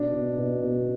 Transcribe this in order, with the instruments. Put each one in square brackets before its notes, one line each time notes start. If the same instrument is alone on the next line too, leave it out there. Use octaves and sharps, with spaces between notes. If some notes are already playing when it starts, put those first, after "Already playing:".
Already playing: [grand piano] B2 D4
B2
B2
B2